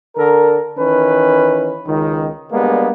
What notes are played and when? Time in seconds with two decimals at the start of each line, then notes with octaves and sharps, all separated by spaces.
0.16 D3 A4 A#4
0.78 D#3 E3 C#4 B4
1.87 C#2 D#3
2.52 G3 G#3 A#3 B3 D4